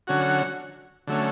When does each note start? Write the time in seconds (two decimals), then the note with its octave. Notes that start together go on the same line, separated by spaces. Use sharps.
0.07 D3 F#3 C#4 F#4
1.07 D3 F#3 A3 C#4